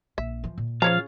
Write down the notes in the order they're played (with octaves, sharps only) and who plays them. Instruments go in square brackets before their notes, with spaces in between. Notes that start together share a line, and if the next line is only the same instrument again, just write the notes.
[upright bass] A#1 [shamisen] E5
[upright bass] E3 F3
A#2
[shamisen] C#3 C#5 A#5 [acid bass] F3 [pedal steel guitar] F4 F5